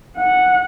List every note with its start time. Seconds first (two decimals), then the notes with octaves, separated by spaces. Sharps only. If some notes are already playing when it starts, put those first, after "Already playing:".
0.17 F#5